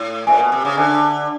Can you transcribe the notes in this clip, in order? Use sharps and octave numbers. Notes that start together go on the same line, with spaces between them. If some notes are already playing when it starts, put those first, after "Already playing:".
Already playing: A2
A#2 C5 E5 G#5
B2
C3
C#3
D3 C5 E5 G#5